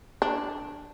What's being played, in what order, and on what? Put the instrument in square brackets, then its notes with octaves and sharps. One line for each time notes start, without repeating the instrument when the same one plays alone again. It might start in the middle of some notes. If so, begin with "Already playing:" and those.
[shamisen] D4